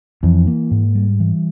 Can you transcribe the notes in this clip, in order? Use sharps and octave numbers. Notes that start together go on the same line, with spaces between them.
F2 E3
A#3
G#2
G3
E3